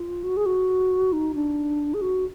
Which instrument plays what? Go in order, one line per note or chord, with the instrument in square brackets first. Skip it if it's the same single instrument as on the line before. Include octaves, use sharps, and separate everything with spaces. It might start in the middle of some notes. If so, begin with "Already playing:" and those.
Already playing: [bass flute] F4
F#4
G#4
F#4
D#4
D4
G#4
F#4